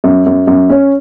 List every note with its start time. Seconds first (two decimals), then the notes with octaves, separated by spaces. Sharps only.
0.04 F#2
0.26 F#2
0.47 F#2
0.70 C#4